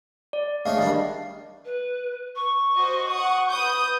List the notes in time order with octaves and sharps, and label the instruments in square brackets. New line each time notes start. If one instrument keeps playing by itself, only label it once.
[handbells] D5
[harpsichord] G#3 A3 C#4 [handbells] F5
[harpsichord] D#3 G3 D4
[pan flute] B4
C#6
[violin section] F#4 C5 D#5
F#5 D#6
B4 D#6 G6